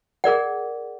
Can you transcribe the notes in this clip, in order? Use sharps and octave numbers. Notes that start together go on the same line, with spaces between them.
G#4 A#4 D5 F#5